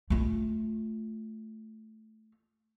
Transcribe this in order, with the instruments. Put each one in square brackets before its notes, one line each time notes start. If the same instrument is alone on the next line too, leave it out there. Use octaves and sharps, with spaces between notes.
[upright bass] A3 F4